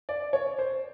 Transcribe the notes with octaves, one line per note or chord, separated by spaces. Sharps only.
D5
C#5
C5